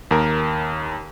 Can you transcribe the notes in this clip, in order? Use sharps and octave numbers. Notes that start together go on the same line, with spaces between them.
D#2 A#4